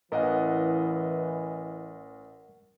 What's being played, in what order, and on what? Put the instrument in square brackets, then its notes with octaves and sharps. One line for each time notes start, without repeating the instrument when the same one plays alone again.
[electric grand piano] A1 D#5 F5 [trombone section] E3 [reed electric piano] A#4 F#5